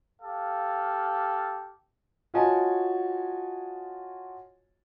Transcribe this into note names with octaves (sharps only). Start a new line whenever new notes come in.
G4 A4 F5
F4 F#4 C#5 D#5 G#5 A5